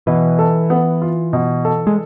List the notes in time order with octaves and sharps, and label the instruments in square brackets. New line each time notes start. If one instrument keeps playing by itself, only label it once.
[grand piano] B2 [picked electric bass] E3
[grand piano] A4
B3
F4
B2
A4
[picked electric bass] G#3